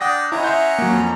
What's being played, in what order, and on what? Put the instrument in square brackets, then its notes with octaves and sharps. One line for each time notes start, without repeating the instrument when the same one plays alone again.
[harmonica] D4 D5 G5 [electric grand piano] F#5 D#6 A#6
[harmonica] C#4 F#5 A#5 [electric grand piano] E4 D#5
[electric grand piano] E5 C6 G6
F#3 A#3
F2